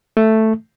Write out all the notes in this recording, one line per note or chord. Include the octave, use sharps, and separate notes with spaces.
A3